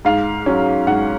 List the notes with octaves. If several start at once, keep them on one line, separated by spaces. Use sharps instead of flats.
G#2 F5
F#3 C#4
G#2 F#5